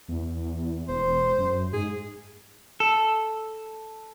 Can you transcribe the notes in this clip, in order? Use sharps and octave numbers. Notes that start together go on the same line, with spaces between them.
E2
E1 C5
F#2
G#2 G#4
A4